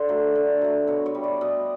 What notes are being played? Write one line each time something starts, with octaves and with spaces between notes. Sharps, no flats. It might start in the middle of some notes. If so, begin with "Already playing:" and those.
Already playing: D3 C5
F#3 A3
D3
F#3 A3
B2 C#5
C#5
G3
D5
B2 D#5